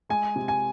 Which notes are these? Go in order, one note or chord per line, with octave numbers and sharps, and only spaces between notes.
G#3 G#5
C3
G#5